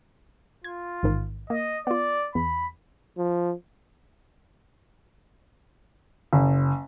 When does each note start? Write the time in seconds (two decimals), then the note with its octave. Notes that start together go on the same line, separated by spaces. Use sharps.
0.64 F4 G#6
1.03 A1 G#2 D#3
1.50 A#3 D#5
1.87 B3 F4 D5
2.35 E2 B5
3.17 F3
6.33 F#1